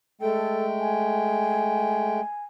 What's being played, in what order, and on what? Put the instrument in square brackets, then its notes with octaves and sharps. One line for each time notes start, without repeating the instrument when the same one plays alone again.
[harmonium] G#3 A3 G5 [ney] A4
[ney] G#5